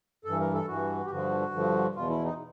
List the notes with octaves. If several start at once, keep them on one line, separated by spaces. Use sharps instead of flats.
G2 E3 A4
A#4
A4
G2 E3 F#4
G4
G2 D3 F3 F#4
G2 D3 F3
E2 B2 F4
E4
D#4